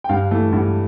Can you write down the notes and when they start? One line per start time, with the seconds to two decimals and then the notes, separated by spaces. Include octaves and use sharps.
0.04 G5
0.09 G2 F5
0.31 E3 A3
0.53 G2